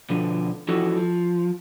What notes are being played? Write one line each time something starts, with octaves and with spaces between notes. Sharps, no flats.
B2 D3 F3
E2 F3 E4 F#4 A4
F3